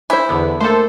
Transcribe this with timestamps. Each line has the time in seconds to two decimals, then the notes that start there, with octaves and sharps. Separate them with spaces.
0.10 E4 C5 G#5
0.29 E2 D3 B3
0.60 A3 A#3 A4 A#4 C5